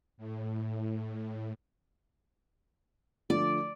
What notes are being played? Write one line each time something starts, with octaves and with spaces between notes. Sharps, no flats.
A2
D3 F3 A3 D5